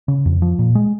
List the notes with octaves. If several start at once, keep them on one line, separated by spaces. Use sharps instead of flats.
C#3
F2
F3
A#2
G#3